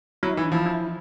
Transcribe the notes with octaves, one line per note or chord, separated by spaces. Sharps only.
F#3 E4
E3 D#4
D4
F3 E4
E4